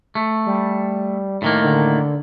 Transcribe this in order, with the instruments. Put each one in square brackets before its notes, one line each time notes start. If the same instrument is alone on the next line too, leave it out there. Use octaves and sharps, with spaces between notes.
[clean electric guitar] A3
[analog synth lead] G3
[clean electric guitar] A2 D#3 A#3
[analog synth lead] D3